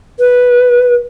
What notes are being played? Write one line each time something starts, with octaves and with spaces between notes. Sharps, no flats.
B4